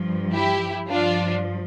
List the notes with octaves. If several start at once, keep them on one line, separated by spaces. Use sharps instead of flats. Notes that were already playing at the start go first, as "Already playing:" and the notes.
Already playing: G2 F3
E4 G4
G2 F3 D4 F4